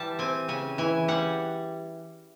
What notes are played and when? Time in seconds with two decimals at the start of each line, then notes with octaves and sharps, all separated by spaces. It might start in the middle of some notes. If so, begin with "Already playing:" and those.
Already playing: E3 G3 A5
0.19 C4 G#5
0.48 C#3 G#5
0.78 E3 G#5
1.08 G3 F#5